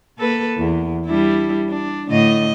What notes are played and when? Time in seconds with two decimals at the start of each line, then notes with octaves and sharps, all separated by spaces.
0.18 A#3 A4 B4
0.57 E2
1.06 G3 D4 E4
1.69 D4
2.10 A2 D3 D#5